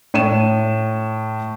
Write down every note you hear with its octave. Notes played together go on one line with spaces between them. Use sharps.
A2 D#7 E7